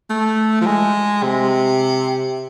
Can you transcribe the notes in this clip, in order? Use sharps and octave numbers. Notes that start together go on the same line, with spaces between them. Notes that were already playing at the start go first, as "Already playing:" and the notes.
A3
F3
G#3
C3